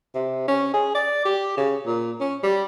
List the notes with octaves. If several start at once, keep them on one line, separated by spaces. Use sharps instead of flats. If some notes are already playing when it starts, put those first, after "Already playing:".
C3
C#4
G#4
D5
G4
C#3
A#2
C#4
G3